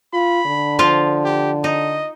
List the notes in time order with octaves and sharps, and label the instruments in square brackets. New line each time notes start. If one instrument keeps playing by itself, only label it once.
[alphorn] F4 [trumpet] B5
[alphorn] D3
[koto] F3 F4
[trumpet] G4
[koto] D#4 [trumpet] D#5